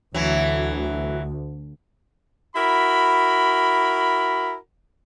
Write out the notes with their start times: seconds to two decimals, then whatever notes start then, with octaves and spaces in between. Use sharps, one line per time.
0.14 D2 E3 F#3
2.56 E4 F#4 A#4 B5